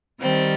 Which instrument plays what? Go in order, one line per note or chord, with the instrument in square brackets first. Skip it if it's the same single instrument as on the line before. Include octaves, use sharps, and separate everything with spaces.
[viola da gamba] D#3 G3 [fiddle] C4